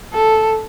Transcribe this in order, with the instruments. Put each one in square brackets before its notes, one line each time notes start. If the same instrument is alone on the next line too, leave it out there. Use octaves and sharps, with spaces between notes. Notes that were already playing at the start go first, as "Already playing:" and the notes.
[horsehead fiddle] A4